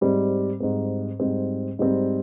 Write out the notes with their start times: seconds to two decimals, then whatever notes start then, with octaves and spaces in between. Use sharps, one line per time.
0.01 G#2 G3 C4
0.60 G#2 G3 C4
1.20 G#2 G3 C4
1.79 G#2 G3 C4